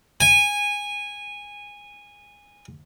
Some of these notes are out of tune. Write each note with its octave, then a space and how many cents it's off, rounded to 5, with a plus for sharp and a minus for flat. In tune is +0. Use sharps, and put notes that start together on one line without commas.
G#5 -15